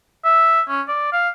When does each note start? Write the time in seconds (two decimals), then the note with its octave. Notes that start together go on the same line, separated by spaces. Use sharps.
0.24 E5
0.69 C#4
0.88 D5
1.13 F5